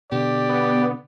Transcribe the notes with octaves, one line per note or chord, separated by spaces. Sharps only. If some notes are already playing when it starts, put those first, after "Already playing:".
B2 D3 G4 D5
B3